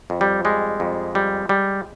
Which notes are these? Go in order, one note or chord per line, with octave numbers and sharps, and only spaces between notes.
F2
G3
G3 G#3
F2
G3
G3